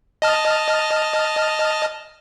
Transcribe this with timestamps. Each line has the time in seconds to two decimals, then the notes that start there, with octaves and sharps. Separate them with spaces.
0.22 D#5 A5 F6